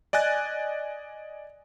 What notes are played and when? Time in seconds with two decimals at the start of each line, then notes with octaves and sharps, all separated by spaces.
0.13 D5 D#5 G#5 F#6 A6